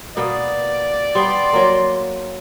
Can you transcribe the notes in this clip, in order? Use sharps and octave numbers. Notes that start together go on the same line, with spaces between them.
B2 A#3 B3 D5
G3 B3 C6
F#3 A#3